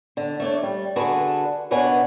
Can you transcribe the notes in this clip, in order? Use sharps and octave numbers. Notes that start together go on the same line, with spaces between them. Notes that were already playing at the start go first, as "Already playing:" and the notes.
D3
A3 D4 C#5
G3
D3 F#4 G#4 A4 B4
B2 D4 B4 C#5 F#5 G#5